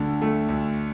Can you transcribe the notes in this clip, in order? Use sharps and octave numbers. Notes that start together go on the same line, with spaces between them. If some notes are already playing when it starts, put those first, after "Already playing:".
Already playing: D2 D3
A3
D2